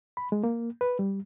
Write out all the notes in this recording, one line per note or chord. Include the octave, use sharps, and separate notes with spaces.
B5
G#3
A#3
B4
G3